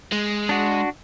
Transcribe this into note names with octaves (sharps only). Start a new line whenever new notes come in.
G#3
D4 F#4